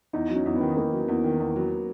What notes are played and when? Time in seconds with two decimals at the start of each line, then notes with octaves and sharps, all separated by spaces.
0.13 E2 D#4
0.30 F#3
0.35 C#4
0.46 E2
0.56 B3
0.61 D#3
0.77 E2 A#3
0.93 F#3
1.08 E2
1.24 D#3
1.40 E2
1.56 F#3